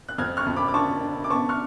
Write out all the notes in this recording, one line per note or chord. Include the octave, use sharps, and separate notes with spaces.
F#6
F2 F6 G#6
C#6 F6
F2
B5 D6
D6
D3 A5 C#6
D3
D6
B3 A5 C#6
C#6 F6